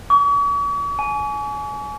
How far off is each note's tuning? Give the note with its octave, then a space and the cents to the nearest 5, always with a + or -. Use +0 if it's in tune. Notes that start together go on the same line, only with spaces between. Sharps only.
C#6 +45
G#5 +25